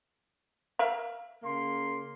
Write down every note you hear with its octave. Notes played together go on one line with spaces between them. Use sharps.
A#4 E5 F5
C#3 A#3 C6